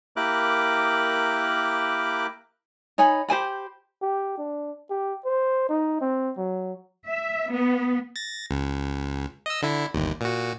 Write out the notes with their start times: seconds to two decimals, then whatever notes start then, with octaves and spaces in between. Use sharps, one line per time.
0.16 A#3 E4 G4 A#4 D6 F#6
2.98 D#4 C#5 G#5 B5
3.28 G4 C5 G#5 B5
4.02 G4
4.38 D4
4.90 G4
5.25 C5
5.69 D#4
6.01 C4
6.38 F#3
7.06 E5
7.50 B3
8.16 A6 A#6
8.51 C#2
9.46 D#5 E6
9.62 D3 E4
9.94 G1 D#2
10.21 A#2 F#4